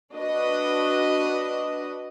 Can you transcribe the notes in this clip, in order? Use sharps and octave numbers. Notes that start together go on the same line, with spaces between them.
D4 F#4 B4 D#5